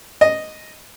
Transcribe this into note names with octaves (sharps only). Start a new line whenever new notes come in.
D#5